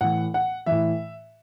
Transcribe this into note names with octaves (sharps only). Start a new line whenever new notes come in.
A2 E3 F#5
F#5
A2 E3 E5